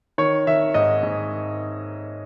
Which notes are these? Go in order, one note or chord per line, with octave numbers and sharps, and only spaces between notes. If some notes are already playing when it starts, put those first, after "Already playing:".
D#3 C#5
D#3 E5
G#2 D#5
G#2